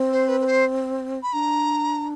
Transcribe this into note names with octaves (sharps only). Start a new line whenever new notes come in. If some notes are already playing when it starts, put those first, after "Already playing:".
Already playing: C4
C5
B4
B4
C5
B5
D4 A#5